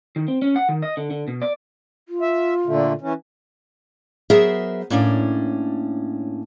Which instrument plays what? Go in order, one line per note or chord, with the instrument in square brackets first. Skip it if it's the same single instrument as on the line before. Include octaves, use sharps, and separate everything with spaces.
[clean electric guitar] D#3
C4
C#4
F#5
D#3
D#5
D3
D3
B2
D5
[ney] F4
[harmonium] E5
A#2 D3 A3
E3 C#4
[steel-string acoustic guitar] F#3 B3 G#4 A#4 C5 E5
A2 A#3 C#4 D4